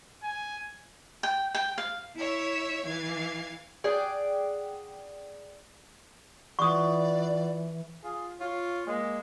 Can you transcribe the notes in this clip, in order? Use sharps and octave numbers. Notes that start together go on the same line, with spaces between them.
G#5
G5
G5
F5
E4 C#5 E5
E3 F5 G#6
G#4 D5 F#5 G5
E3 F4 D5 F#5 C#6 D#6
F4 G#4
F4 C#5
G#3 A#3